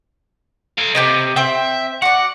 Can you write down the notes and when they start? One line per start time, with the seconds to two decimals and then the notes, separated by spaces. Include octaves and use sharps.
0.78 A4 F5
0.95 C3 G4 B4 D#5
1.36 C4 E5 G5
2.02 F#4 D5 F#5